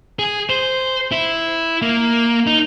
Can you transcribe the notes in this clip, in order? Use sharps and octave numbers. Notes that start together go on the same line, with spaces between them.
G#4
C5
E4
A#3
D#4